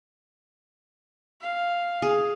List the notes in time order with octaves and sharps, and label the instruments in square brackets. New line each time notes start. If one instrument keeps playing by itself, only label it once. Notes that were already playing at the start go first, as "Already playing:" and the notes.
[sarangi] F5
[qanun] G#4